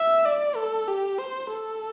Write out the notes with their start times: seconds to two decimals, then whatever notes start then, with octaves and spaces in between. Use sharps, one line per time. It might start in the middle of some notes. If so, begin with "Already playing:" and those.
Already playing: E5
0.25 D5
0.56 A4
0.88 G4
1.18 C5
1.50 A4